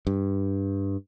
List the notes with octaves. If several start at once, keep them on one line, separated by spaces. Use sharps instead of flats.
G2